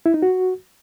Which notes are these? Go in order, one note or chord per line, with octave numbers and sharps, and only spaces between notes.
E4
D#4
F#4